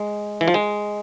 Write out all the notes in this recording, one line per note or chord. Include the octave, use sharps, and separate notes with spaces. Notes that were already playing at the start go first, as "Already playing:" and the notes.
Already playing: G#3
E3
F3
G#3